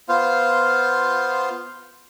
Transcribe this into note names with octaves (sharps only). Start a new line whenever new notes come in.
B3 F4 C5 F5